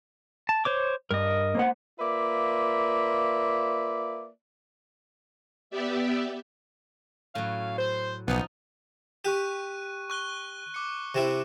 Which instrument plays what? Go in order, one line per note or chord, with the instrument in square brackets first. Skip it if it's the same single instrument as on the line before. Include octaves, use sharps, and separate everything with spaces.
[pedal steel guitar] A5
C5 C#5 D6
[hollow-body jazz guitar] G2 [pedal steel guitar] A#4 D#5
[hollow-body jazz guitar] A#3 C5 F#5
[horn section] A#3 F4 B4 D5 E5
[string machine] B3 G4 D5 E5
[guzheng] A2 F#3 [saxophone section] C#4 F5
[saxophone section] C5
[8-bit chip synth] B1 [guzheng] F3 D#4 [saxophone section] B3
[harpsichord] G4 [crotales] C#6 F#6 D#7
[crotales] C#6 F#6 G7
D6 C#7
[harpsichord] C3 C4 E4